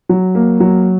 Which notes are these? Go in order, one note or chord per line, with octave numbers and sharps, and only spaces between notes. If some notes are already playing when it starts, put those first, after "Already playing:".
F#3
A#3
F#3